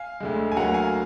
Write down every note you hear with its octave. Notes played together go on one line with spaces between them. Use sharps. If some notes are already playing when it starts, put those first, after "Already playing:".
Already playing: F5 G#5
D2 D3 G#3
G#5
D2 D3 F#3 A#3 F#5 A#5
F5 G#5